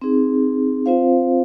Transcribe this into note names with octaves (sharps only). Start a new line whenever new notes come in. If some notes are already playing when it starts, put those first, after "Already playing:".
C4 D#4 G#4
C4 F4 C5 F5